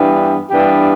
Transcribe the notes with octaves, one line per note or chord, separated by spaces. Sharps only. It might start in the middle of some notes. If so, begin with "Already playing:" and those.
Already playing: G2 E3 B3 D4 G4
G2 E3 B3 D4 G4